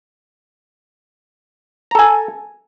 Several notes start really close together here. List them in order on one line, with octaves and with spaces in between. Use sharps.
A#5 A4 G#5